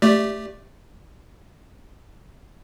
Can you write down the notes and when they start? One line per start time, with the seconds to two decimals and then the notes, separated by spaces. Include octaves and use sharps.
0.02 A3 G4 D5